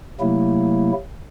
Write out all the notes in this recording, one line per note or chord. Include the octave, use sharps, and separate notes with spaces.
C3 F#3 A3 A#3 E4